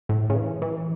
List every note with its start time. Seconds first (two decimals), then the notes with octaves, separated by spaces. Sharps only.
0.09 A2
0.30 C#3
0.35 E3
0.62 E3